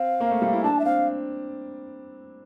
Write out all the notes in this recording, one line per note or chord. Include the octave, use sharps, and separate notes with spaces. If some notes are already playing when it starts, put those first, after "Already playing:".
Already playing: C4 F5
A#3
A3
G3
E4
D4 A5
E5
C4 F5